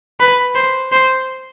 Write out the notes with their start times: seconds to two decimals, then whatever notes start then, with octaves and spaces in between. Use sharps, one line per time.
0.20 B4
0.55 C5
0.92 C5